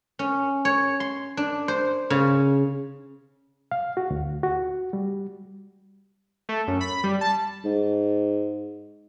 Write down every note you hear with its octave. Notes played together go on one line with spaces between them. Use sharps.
C#4
C#5
C6
D4
C5
C#3
F5
F#4
D2
F#4
G3
A3
F#2
B5
G3
A5
G#2